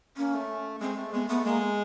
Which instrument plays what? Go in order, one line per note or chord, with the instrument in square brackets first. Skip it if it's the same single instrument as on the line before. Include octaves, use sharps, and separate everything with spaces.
[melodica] A#3 [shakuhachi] C#4
[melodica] A3
[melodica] G#3 [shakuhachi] C4
[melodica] A3
[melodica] G#3 [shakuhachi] B3
[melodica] A3 [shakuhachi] B3
[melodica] G#3 [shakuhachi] A#3